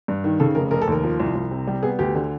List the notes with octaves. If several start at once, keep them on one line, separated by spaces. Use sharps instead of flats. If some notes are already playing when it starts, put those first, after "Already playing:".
G2
D#3
C#3 A4
F1 A#4
F1 A#4
A4
D#2 A#4
F3
C2
C2
C3
G3
B3 G#4
D2 G4
D3